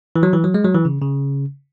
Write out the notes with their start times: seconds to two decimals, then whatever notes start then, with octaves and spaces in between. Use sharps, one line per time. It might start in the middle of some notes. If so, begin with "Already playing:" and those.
0.16 E3
0.23 F#3
0.33 E3
0.44 F#3
0.54 G#3
0.65 F#3
0.75 E3
0.85 C#3
1.02 C#3